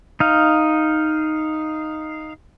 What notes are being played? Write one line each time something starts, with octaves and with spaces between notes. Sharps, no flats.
D#4 F5